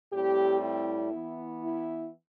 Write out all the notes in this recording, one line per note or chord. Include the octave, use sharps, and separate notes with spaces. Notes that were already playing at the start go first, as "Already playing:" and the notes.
A2 G3 C4 G4
E4
E3 B3
E4